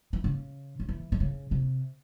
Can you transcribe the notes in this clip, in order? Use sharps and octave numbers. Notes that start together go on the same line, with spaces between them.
E3
C#3
C#3
E3
E3
C#3
C3